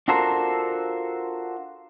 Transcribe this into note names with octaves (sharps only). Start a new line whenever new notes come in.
D4 F4 F#4 A4 A#4 C5